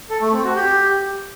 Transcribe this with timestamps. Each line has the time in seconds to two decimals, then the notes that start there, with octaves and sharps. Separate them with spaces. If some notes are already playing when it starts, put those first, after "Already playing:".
0.10 A4
0.21 A3
0.33 C4
0.44 F#4
0.56 G4